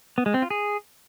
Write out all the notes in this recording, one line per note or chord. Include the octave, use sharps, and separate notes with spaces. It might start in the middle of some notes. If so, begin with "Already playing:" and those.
B3
G#3
C4
F4
G#4